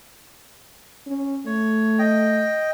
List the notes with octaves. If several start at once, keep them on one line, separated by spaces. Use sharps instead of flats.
C#4
A3 C#5
D#5 G5